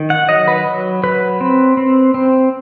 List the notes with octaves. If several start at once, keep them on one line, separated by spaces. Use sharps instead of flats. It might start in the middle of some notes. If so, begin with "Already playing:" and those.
Already playing: D#3
F#5
F#3 D#5
B4
F#3
F#3 B4
C4
C4
C4